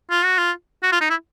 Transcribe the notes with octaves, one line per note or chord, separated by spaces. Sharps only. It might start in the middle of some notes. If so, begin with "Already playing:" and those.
F4
F#4
F4
F#4
F4
D#4
E4